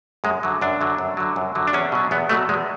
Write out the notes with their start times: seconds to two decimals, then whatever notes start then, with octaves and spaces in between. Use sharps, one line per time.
0.24 F#2 G#3
0.43 D3 F#3
0.61 F#2 D4
0.81 D3 F#3
0.98 F#2
1.17 D3 F#3
1.36 F#2
1.55 D3 F#3
1.67 D4
1.73 E2 C#4
1.92 B2 F#3
2.11 E2 B3
2.29 B2 F#3 A3
2.49 E2 G#3